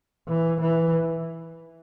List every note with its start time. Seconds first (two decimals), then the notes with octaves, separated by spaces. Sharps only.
0.28 E3
0.61 E3